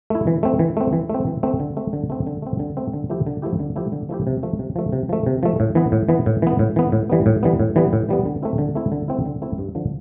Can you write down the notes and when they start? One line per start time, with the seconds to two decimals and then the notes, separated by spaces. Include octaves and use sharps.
0.10 A3 E4
0.27 E3
0.43 A3 C4
0.59 E3
0.77 A3 C4
0.93 E3
1.10 A3 C4
1.27 E3
1.43 A3 C4
1.60 D3
1.77 A3 C4
1.93 D3
2.10 A3 C4
2.27 D3
2.42 A3 C4
2.59 D3
2.77 A3 C4
2.93 D3
3.10 F3 A3 E4 G4
3.27 D3
3.42 F3 A3 E4 G4
3.60 D3
3.76 F3 A3 E4 G4
3.92 D3
4.09 F3 A3 E4 G4
4.27 C3
4.43 F3 A3
4.59 C3
4.76 F3 A3
4.92 C3
5.09 F3 A3
5.26 C3
5.43 F3 A3
5.60 A2
5.75 E3 B3
5.92 A2
6.09 E3 B3
6.26 A2
6.42 E3 B3
6.59 A2
6.76 E3 B3
6.92 A2
7.10 E3 G3 B3
7.26 A2
7.43 E3 G3 B3
7.60 A2
7.76 E3 G3 B3
7.93 A2
8.09 E3 G3 B3
8.26 D3
8.42 A3 C4 E4
8.58 D3
8.75 A3 C4 E4
8.92 D3
9.08 A3 C4 E4
9.25 D3
9.42 A3 C4 E4
9.58 G2
9.75 D3 F3